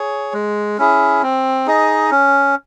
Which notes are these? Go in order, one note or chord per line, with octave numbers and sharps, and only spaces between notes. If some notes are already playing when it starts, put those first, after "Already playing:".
Already playing: G#4 C#5
G#3
C#4 E4 G#4
C4
D#4 G#4 D#5
C#4